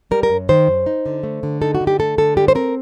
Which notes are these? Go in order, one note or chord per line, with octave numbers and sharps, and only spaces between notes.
G3 A#4
A#4
F#2
D#3 C5
F#2
D#4
D3
A3
D3
D#4 A4
F#4
D3
G4
A3 A4
D3 A4
G3 G4
C5
C4 A#4